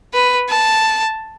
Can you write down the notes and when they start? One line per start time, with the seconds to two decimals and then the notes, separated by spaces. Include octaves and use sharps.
0.14 B4
0.50 A5